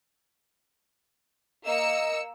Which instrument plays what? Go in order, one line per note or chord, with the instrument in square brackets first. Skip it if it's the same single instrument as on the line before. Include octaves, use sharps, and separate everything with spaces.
[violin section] A#3 E6 C#7 [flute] D#5